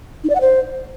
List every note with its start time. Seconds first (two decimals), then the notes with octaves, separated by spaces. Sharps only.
0.24 D#4
0.30 D5
0.35 F#5
0.41 C5